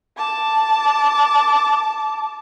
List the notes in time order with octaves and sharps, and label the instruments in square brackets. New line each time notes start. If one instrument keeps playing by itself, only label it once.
[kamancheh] A5 D6